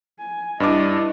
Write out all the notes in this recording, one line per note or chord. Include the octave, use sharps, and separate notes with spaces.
G#5
G2 D4 E4 D#5 D6